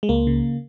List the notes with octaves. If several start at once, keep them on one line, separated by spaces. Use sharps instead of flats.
G#3
C#2 A#3
C#3